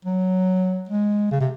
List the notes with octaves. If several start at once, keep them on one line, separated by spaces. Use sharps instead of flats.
F#3
G#3
C#3
C3